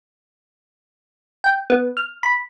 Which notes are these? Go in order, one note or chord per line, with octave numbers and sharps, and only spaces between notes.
G5
B3
F6
B5